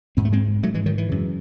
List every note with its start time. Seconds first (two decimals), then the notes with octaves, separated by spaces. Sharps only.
0.17 G#2 C4
0.25 A3
0.32 G#3 C4
0.63 G#2 F#3 A3
0.74 E3 G#3
0.86 D#3 F#3
0.98 E3
1.09 F#2 C#3